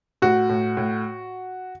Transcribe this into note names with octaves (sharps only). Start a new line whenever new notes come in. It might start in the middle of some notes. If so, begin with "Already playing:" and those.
A2 F#4
A2
A2